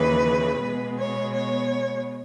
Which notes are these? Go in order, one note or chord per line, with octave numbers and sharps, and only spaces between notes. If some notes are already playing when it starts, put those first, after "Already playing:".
Already playing: D#2 C#3 E3 B4
B2 G#3 B3
C#5
C#5